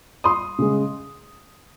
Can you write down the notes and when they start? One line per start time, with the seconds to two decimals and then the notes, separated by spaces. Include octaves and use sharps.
0.24 C6 D#6
0.59 C#3 G#3